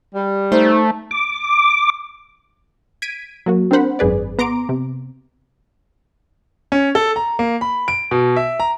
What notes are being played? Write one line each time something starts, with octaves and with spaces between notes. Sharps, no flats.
G3
A3 D#4 C5
D6
G#6 B6 D7 D#7
F#3 A#3 F#4
C4 D4 A#4 C5 F#5 B5
G#1 F#2 G#4 B4 D5
B3 A#5 C6 D6 D7
C3
C#4
A4
A#5
A#3
B5
D7
B2
E5
A#5